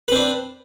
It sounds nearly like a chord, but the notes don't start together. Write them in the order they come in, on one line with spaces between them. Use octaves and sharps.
B4 C4 D4